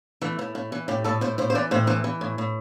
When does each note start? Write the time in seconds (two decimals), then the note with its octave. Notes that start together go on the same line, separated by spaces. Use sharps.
0.21 E3 A3
0.39 A2
0.55 A2
0.72 E3
0.88 A2 G4
1.04 A2 A4
1.21 A2 C5
1.38 A2 C5
1.50 C5
1.55 E3 D5
1.71 A2 C5
1.87 E3 C5
2.04 E3
2.21 A2
2.38 A2